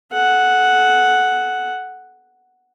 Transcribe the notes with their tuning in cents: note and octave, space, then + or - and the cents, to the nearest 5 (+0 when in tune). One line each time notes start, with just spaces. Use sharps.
A4 -35 F#5 +0